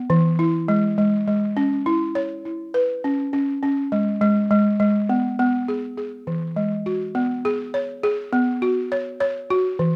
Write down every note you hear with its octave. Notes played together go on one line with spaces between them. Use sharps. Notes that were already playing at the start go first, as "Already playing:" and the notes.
Already playing: B3
E3
E4
G#3
G#3
G#3
C#4
E4
C#5
E4
B4
C#4
C#4
C#4
G#3
G#3
G#3
G#3
B3
B3
G#4
G#4
E3
G#3
F#4
B3
G#4
C#5
G#4
B3
F#4
C#5
C#5
F#4
E3